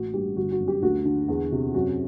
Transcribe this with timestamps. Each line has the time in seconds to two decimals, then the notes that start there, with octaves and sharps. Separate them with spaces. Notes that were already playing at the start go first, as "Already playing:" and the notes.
Already playing: A1 F#4
0.13 G2 G4
0.37 G1 F#4
0.52 F#4
0.60 F#2
0.68 G4
0.82 D2 F#4
1.05 D3
1.28 E2
1.51 C3
1.74 F#2 F#4